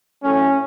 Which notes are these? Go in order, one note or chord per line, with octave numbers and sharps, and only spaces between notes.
A2 F#3 A3 C#4